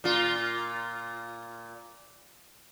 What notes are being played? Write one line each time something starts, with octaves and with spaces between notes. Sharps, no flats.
A#2 F4